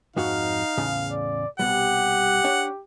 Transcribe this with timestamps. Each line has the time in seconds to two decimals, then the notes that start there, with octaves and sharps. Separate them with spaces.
0.16 F2 G#2 D#4 F#4 F5
0.78 E2 A2 C#3
1.11 D5
1.59 C2 B2 G3 G4 F#5
2.44 D4 C#5